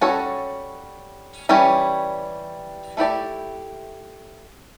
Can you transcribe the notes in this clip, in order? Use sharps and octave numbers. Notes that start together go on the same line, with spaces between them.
G3 C#4 F#4 A4 C#5
E3 G3 C#4 G4 C#5
A3 E4 G4 D5